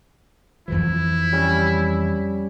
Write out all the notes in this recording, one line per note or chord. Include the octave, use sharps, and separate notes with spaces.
F2 E3 F3 E4
G3 C#4